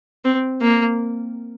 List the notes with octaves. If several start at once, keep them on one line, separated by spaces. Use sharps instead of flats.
C4
A#3